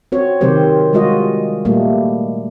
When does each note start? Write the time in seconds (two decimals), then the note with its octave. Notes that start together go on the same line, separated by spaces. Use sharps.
0.12 C4 F#4 C#5
0.41 C3 D#3 F#3 C4 G4 C5
0.93 G3 G#3 F4 F#4 D#5
1.65 A#2 G3 A3 A#3